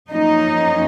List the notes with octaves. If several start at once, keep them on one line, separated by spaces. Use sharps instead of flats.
F#2 F3 A#3 C#4 D#4